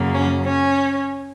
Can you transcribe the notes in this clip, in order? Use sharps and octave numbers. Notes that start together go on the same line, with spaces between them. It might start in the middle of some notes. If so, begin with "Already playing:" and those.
Already playing: F#2 C#3 F#3 A#3
C#4
C#4